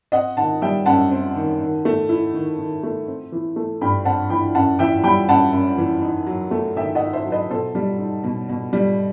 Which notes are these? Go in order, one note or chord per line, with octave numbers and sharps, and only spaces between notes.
C4 D#5 F#5
D#3 F#5 A5
G3 E5 G5
F#2 F#5 A5
C4
D#3
D#3
A3
E4
D#3
D#3
A3
C4
E3
A3
G2 G5 B5
C4 F#5 A5
E3 G5 B5
F#2 F#5 A5
E3 E5 G5
G3 G5 B5
F#2 F#5 A5
F#2
E3
D#4
F#3
A3
D#3 E5 G5
D#4 D#5 F#5
C5 E5
F#3
B4 D#5
B2 A4 C5
G3
D#4
B2
B2
G3